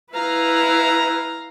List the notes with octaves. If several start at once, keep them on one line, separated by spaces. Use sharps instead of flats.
E4 B4 F5 A#5